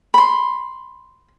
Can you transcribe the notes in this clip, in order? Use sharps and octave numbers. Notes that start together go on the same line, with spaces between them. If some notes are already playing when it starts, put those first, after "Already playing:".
B5 C6